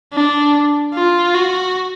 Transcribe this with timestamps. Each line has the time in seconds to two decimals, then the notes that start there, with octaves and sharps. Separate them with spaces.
0.13 D4
0.94 F4
1.35 F#4